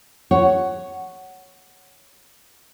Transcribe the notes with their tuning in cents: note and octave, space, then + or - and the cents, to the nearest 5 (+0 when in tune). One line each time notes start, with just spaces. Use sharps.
C#5 +0 F#5 +10